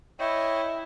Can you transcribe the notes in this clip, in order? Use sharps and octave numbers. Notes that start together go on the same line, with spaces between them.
E4 C#5 D#5 G5